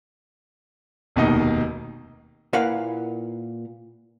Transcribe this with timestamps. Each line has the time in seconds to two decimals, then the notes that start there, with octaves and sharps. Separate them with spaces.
1.16 F1 D#2 B2 D#4 D#5
2.53 A#2 E4 A#4 B4 F5 F#5